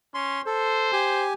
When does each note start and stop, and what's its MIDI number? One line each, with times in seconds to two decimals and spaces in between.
0.14 0.41 61
0.14 0.42 84
0.46 0.91 69
0.46 1.26 72
0.93 1.34 67
0.93 1.34 80